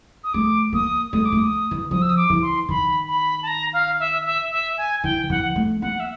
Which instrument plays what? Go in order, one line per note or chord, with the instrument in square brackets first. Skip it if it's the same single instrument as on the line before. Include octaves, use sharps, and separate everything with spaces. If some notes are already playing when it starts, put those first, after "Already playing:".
[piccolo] D#6
[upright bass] A3 [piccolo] D6
[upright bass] A#3 [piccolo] D#6
[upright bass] A3 [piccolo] D#6
[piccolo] D6
[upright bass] A3
[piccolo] D#6
[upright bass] E3
[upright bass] F3 [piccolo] D#6
[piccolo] E6
D#6
D6
[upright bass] E3
[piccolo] C6
[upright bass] D#3 [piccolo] B5
[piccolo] B5
A5
A#5
F5
E5
E5
E5
G#5
[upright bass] E3 [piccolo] G5
[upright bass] E3 [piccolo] F#5
[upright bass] A3
[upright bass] A#3 [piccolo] F#5
[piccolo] E5